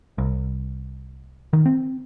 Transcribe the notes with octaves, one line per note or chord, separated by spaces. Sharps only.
C2
D#3
C4